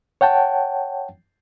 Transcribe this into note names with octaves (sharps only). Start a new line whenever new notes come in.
C#5 F#5 G5 A5